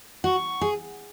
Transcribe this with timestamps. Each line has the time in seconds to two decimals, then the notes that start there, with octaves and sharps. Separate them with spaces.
0.24 F#4 C#6
0.61 G#4